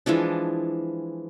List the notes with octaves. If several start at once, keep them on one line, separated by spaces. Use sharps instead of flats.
E3 F3 G#3 D4